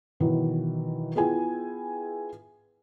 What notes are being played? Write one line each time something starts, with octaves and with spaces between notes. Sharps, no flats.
B2 D#3 E3 F#3
B3 E4 F4 G#4 G5 G#5